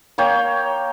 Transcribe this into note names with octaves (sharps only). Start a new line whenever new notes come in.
A#3 C#5 G5